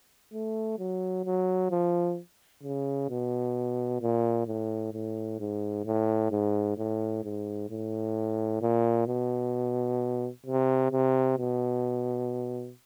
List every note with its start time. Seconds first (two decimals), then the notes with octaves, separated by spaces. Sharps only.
0.33 A3
0.79 F#3
1.25 F#3
1.71 F3
2.63 C#3
3.09 B2
4.01 A#2
4.47 A2
4.93 A2
5.40 G#2
5.85 A2
6.31 G#2
6.77 A2
7.24 G#2
7.70 A2
8.62 A#2
9.07 B2
10.46 C3
10.92 C3
11.38 B2